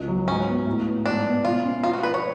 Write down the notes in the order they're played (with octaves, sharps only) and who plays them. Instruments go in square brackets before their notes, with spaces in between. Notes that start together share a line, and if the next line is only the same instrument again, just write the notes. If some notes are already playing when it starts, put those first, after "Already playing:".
Already playing: [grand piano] C#2
F#3
[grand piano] G#2 [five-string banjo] C#4
[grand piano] B3
A2
B3
[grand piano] G#2 [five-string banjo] D4
[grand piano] B3
[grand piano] B2 [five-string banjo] F4
[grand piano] C#4
[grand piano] F3 [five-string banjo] F4
[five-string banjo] F#4
[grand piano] D4 [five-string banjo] B4
[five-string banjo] C#5